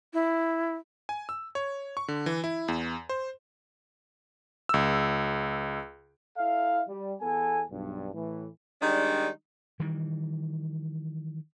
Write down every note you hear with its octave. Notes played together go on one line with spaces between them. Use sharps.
E4
G#5
E6
C#5
C#6
D3
E3
E4
E2
C5
C#2 E6
E4 A4 E5 F5
G3
E2 B3 A4 G#5
B1 G2
A2 E3
D#3 G3 G#3 D4 D#4
D#3 E3 G3